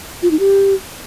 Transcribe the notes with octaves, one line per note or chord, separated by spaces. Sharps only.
F4
D#4
G4